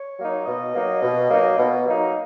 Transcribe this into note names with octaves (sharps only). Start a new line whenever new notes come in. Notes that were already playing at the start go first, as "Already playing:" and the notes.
Already playing: C#5
F#3 A#3 D#4
B2 D#5
F#3 A#3 D#4
B2
F#3 A#3 D#4
B2
F#3 A#3 D#4